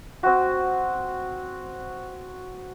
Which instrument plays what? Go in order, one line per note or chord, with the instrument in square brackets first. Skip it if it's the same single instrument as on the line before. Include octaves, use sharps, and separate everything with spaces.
[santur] C4 F#4